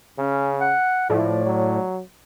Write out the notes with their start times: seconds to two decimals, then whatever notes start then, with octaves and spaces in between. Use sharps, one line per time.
0.18 C#3 C#4
0.60 F#5
1.10 A2 F3 D5
1.46 F#3